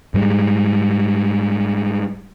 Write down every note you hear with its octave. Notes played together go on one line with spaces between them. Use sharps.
G#2 G3 G#3